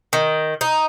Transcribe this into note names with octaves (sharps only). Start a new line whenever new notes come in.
D#3
D#4